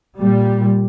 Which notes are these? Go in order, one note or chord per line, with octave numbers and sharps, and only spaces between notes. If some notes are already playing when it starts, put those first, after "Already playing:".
A#2 G3